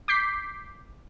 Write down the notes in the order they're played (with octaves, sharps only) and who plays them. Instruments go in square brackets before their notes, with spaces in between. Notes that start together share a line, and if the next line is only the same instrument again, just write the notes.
[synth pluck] D6 G6 B6 C7